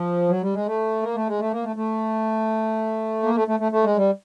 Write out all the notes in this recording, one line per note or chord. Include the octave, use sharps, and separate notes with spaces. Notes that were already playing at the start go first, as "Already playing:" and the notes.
Already playing: F3
F#3
G3
G#3
A3
A#3
A3
G#3
A3
A#3
A3
A3
A#3
A3
A3
A3
A3
G#3
G3